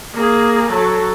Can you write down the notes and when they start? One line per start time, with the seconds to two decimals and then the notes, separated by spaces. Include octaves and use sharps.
0.13 A#3 G#4
0.69 F#3 A4